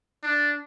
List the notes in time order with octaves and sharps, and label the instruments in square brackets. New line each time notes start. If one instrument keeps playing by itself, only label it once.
[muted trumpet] D4